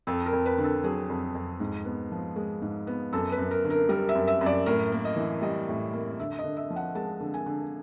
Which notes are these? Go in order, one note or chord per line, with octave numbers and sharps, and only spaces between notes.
F2 A4
A#4
F2
B4
D3
A4
F#3 G#4
F2
F2
G#2
B3
F3
G#3
G#2
B3
F#2 A4
B4
F#2
A#4
D3
A#4
G3 A#4
E5
F#2
E5
F#2
D5
A2 A#4
A#3
D#5
E3
G3 D#5
A2
A#3
D3 E5
D#5
D3
E5
F3
F#5
G#3 A5
D3
G#5
D3